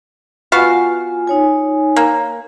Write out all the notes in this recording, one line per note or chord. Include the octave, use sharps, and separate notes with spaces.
B3 F4 F#4 F5 G#5
D#4 C#5 G#5
A#3